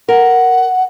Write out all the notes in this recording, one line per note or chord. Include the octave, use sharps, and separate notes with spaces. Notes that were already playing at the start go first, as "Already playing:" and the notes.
A#4 F#5